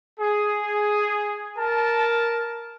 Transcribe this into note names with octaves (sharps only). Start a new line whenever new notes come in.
G#4
A#4 A5